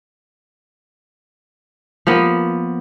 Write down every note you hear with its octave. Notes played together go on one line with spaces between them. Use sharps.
F3 A#3 B3